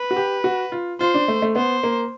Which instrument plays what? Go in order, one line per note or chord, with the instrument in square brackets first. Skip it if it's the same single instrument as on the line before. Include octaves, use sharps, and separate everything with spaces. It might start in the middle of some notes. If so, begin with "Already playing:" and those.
Already playing: [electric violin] B4
[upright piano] F#4
G4
F#4
F4
[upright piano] F4 [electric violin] C5
[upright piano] D4
A3
A3
[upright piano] B3 [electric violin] C5
[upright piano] A#3